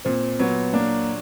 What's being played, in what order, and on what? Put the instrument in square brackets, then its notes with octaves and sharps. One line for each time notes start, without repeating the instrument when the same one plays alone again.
[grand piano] A#2 [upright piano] C4
[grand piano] F#3 [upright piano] B3
[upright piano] A#3 [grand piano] D4